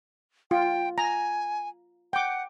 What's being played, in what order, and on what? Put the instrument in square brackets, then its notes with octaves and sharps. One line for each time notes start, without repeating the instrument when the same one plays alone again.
[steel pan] F4 [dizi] G5
[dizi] G#5 [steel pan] A#5
[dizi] F#5 [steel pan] G5 D6